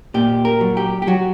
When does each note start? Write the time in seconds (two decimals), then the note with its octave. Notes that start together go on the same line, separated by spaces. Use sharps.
0.14 A#2 G4
0.45 A#4
0.61 F#3
0.77 G4
1.02 G4
1.07 F#3 F#4